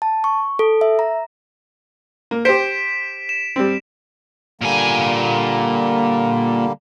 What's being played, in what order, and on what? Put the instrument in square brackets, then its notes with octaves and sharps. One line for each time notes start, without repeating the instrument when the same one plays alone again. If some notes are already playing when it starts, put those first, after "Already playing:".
[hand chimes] A5
C#6
A4
E5
A#5
[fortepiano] A#3
[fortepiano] G4 C5 [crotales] B6 D7 E7
[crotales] E7
[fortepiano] G3 C4
[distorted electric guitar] A#2 G#5 [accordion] D3 G3 A#3